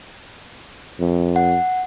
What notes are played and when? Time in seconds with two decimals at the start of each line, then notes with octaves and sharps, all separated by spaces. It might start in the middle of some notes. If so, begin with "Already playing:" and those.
1.00 F2
1.36 F#5